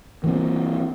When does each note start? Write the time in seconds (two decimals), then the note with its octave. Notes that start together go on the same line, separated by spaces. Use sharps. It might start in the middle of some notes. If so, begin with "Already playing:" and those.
0.24 E3 A#3 C4